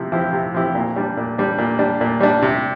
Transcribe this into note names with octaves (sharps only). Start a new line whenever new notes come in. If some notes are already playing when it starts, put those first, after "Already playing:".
Already playing: C3 F3 C4 E4 G4
F3 C4 E4 G4
C3
F3 C4 E4 G4
A#2
G3 D4
A#2
G3 D4
A#2
G3 D4
A#2
G3 D4
C3